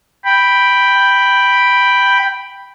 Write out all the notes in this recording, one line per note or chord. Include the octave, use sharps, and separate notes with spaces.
G5 B5